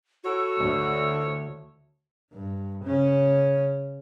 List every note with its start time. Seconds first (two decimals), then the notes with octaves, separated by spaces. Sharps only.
0.24 E4 F#4 A4 C#5
0.60 D2
2.33 G2
2.84 C#3 C#4